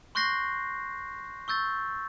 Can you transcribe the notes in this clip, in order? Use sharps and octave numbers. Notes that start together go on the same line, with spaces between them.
C6 C#6 F#6 G6 A#6 C7
C#6 E6 G6 A6